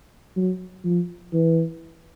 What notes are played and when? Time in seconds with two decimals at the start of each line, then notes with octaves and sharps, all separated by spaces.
0.37 F#3
0.85 F3
1.33 E3